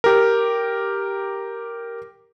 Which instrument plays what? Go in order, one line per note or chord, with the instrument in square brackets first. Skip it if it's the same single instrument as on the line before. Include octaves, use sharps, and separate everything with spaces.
[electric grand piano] G4 A#4